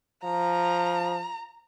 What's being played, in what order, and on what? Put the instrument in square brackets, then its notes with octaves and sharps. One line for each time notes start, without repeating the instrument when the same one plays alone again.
[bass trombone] F3 [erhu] A#5